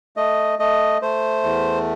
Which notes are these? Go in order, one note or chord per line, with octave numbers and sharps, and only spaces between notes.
A3 D#5
A3 D#5
A3 C5
E2